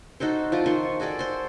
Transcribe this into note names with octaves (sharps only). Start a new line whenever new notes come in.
D#4 F#4 A4 C5
F3 F4 D5
D#3 C5 C#6
F#4 G#4 A4 D5
C5 C6